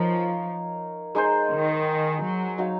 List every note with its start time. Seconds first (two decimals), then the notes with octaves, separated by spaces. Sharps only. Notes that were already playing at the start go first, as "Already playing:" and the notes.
Already playing: F3 D#4 A#4 C#5 F5
1.15 G#3 D#4 G#4 C5
1.51 D#3
2.22 F#3
2.58 D#4 F#4 C#5 F5